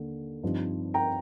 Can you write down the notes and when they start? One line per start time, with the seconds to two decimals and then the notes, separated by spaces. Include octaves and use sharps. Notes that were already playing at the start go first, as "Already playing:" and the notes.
Already playing: D#2 D3
0.43 G2 F3 C4 D#4
0.94 G5 A#5